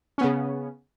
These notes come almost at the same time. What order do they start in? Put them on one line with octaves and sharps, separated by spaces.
C#4 B3 C#3